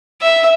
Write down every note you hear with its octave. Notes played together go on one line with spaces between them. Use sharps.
E5